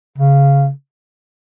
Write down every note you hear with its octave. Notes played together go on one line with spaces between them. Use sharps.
C#3